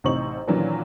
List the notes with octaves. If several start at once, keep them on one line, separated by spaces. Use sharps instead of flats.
A1 C3 D#4 C5 C#6 F#7
A#2 D#3 E3 F#3 C#4 D4